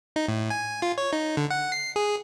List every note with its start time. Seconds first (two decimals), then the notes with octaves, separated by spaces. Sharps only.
0.16 D#4
0.28 A2
0.50 G#5
0.82 F4
0.98 C#5
1.13 D#4
1.37 D3
1.51 F#5
1.72 C7
1.96 G#4